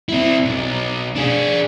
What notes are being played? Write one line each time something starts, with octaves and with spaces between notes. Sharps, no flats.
C4 E4
B1
D4 G#4